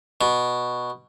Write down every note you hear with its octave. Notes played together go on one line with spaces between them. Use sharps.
B2